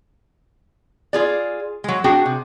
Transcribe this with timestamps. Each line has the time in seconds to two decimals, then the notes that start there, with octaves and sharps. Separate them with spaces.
1.13 F4 G#4 D5
1.84 F#3 G#3
2.04 D4 F#4 G#4 G5
2.26 C3